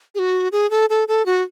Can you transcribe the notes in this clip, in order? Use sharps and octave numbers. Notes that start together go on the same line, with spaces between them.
G#4
F#4
G#4
A4
A4
A4
F#4